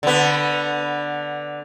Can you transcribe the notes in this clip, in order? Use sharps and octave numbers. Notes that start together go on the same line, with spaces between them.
D3 B3